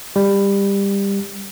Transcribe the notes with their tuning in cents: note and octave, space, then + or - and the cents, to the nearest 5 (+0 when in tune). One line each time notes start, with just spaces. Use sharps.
G3 +20